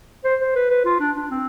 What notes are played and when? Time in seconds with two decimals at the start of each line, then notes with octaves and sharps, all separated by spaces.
0.24 C5
0.40 C5
0.55 B4
0.70 B4
0.85 F4
1.00 D4
1.16 D4
1.31 C4